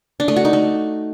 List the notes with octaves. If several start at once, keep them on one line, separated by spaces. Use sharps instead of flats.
D4
A3
F#4
D#4
A3